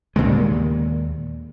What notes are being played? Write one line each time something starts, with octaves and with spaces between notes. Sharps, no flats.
D#2 A#2 D#3 G#3